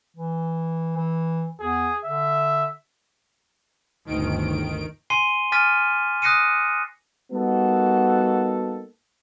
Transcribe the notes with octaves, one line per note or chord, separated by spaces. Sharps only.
E3
E3
E2 G#4
D3 E5
G1 D2 D#3 D7
G#5 C6 C7 D#7 G7
G#5 D6 F6 A6 B6 D#7
D#6 F#6 A#6 C7 C#7 D#7
G3 A#3 B3 D#4 F#4 A4